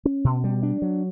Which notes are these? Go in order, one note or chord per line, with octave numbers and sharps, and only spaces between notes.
C#4
B2
G3
D4
F#3